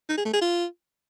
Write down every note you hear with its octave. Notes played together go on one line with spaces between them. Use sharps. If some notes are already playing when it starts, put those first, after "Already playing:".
D#4
G#4
A3
G#4
F4